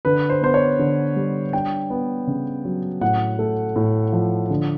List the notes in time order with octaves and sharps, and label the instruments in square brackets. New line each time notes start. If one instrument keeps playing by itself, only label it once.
[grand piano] D3 B4
C5
B3 C5
C#5
D3
G3
D4 G5
B3
C#3
F#3
A2 F#5
A3
A2
F3
D3